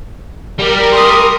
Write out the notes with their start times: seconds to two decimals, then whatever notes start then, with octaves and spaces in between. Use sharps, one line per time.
0.59 G3 A#4
0.92 C6 D#6